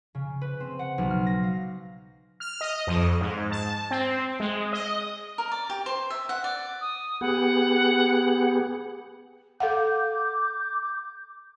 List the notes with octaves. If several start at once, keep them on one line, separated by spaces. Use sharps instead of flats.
C#3
B4
C4
F#5
B1
F6
A#6
F5
F6
D#5
F2
G#2
A5
C4
G#3
D#5
A#4
D5
G4
C5
E5
F#5
D5
D#6
B3 G4 G#4 F#5
A4 F5 F#5 D6 G6